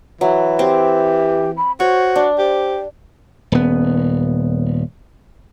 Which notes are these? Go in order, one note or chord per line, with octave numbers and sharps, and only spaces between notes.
E3 F#3
C4 G4
B5
F#4 C5 C#5
D4
G4 C5
D#1 B3